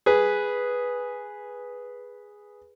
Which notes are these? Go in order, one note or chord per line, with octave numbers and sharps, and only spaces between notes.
G#4 B4